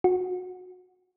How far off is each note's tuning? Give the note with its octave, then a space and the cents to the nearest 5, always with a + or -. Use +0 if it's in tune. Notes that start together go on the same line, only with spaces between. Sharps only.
F#4 -25